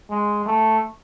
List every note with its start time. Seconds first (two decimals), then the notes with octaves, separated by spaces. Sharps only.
0.10 G#3
0.46 A3